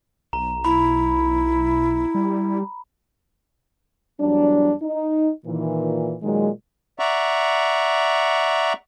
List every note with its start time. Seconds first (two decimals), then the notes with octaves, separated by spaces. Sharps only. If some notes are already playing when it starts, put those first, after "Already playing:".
0.33 B1 A#5
0.65 E4 B5
2.15 G3
4.20 E2 F#3 G3 D4
4.82 D#4
5.45 A#2 D#3 E3
6.22 A#2 D#3 F#3 G#3
6.99 D5 E5 F#5 A#5 C#6